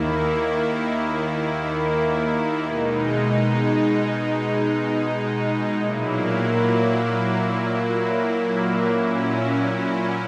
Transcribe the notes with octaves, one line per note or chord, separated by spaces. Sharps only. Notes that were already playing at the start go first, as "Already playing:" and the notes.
Already playing: D#2 D#3 A#3 E4
B2 G#3 D#4
A#2 F#3 A#3 E4
A#2 F#3 C#4 E4